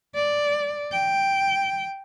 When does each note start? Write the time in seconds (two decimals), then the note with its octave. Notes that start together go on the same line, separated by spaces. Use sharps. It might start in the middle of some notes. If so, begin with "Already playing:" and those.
0.15 D5
0.92 G5